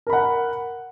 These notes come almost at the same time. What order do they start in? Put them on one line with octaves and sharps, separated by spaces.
A#4 B5 F#5